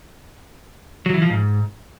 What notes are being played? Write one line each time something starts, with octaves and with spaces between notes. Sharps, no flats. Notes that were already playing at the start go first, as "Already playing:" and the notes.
F#3
E3
F3
G#2